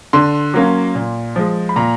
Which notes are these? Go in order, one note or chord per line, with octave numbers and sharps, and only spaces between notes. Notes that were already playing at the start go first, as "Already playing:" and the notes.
D3 C6
F#3 A#3 C#4
A#2
F3 G#3
B5
A#2 A#5